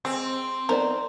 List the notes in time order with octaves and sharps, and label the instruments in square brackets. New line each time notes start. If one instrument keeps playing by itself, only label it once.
[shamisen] G#3 [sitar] C4
[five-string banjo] B3 C5 D5 [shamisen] D#4 A#4